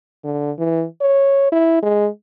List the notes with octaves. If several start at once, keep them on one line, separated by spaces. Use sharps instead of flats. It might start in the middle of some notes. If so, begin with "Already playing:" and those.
D3
E3
C#5
E4
G#3